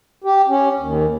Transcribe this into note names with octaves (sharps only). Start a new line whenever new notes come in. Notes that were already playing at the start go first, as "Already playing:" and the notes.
G4
C#4
D#2